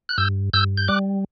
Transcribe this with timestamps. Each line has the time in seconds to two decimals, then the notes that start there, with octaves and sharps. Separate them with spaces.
0.09 F#6
0.18 G2 E6 G6
0.53 G2 E6 G6
0.77 G6
0.88 G3 D6 F#6